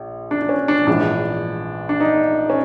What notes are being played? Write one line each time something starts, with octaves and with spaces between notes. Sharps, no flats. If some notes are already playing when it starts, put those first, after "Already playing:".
Already playing: A#1
D4
D4
C#4
D4
A#1 G#2 E3 D4
D4
D#4
C#4